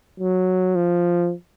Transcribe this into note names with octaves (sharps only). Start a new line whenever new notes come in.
F#3
F3